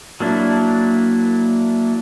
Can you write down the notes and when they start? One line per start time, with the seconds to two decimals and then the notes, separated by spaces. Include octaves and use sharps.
0.20 F#3 A#3 D4 E4